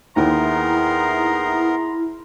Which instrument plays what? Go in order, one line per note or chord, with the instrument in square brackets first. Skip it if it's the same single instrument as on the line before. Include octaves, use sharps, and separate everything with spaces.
[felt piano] D#2 [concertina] B3 A#4 [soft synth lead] E4 [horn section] G#4 A#5 C6